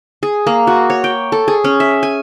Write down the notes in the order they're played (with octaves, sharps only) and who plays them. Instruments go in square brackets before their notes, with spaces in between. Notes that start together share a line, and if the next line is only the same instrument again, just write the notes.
[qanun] G#4
A#3
F#4
C#5
G5
A4
G#4
C#4
E5
G#5